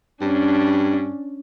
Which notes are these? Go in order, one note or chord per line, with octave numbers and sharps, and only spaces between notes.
G2 C#4 D4